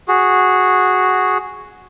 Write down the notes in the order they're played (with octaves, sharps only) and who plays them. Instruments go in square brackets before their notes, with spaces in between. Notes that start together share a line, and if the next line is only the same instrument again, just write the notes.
[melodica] F#4 G#4